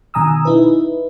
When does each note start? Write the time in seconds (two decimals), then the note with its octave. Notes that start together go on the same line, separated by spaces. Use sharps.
0.14 B2 D#3 G#5 A#5 D#6 E6
0.45 D#4 E4 B4